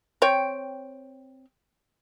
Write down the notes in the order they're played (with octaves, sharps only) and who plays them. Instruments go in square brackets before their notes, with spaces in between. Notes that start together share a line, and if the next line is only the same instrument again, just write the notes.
[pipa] C4 C#5 G5